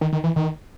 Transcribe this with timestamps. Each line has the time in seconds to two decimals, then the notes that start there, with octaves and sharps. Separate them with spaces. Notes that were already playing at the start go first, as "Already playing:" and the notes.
0.01 D#3
0.13 D#3
0.24 E3
0.36 D#3